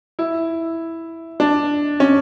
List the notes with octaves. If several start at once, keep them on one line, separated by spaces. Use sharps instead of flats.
E4
D4
C#4